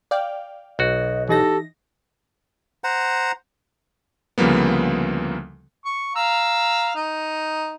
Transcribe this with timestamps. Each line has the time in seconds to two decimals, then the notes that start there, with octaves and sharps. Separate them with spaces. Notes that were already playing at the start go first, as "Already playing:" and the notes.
0.11 D5 F5 G5
0.79 B1 F#4 D#5
1.29 E3 D#4 G4 A4 A#6
2.84 C5 F#5 A#5
4.38 D2 C#3 F3 G3 A#3 B3
5.85 C#6
6.16 F5 A#5 E6
6.95 D#4